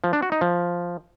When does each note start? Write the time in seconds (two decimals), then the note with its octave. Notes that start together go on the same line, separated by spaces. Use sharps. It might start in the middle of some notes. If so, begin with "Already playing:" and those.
0.04 F3
0.13 D4
0.22 F#4
0.32 D#4
0.41 F3